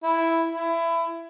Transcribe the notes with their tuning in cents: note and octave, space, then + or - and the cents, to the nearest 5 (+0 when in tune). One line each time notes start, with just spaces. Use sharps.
E4 +0
E4 +20